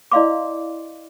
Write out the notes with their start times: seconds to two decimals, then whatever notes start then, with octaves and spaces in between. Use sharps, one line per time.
0.11 E4 D5 D#5 F5 C6 D6